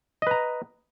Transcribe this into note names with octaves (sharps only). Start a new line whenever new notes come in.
B4 D#5 A#5